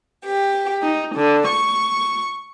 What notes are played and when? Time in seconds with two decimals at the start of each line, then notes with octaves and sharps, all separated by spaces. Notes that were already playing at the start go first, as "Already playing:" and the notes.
0.24 G4
0.82 D#4
1.15 D3
1.47 C#6